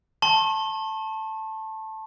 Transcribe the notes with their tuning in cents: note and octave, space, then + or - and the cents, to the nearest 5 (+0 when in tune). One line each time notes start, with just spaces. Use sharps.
A5 +0 C#6 -45